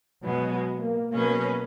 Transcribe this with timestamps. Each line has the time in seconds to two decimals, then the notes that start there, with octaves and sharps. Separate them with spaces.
0.23 B2 F#3 G#3 B3
0.53 F#3
0.82 A#3
1.12 B2 F#3 A#3 C#4 G#4 B4